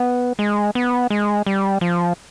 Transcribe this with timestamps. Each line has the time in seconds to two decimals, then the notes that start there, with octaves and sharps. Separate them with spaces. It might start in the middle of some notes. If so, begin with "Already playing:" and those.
Already playing: B3
0.39 G#3
0.75 B3
1.10 G#3
1.46 G3
1.81 F3